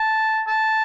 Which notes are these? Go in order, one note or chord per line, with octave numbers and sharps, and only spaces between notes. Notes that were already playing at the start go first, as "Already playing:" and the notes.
Already playing: A5
A5